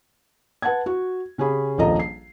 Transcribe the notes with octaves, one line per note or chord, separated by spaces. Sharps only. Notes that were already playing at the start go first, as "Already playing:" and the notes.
B4 F#5 A5 G#6
F#4
C#3 C#4 G4 G#4 B5
D#1 A#1 F3 A4 D#5 A#5
C7